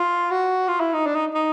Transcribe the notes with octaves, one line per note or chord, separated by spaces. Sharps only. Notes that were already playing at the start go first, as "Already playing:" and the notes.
Already playing: F4
F#4
F4
E4
D#4
D4
D#4
D#4